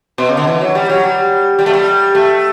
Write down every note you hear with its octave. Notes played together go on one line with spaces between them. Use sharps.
B2
C#3
D3
E3
F#3
G3
F#3
G3
G3
A3
G3
A3